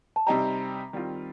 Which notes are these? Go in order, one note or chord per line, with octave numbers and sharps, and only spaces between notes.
A5
C3 G3 C4 D#4 G4 A#5
D#3 G3 C4 F4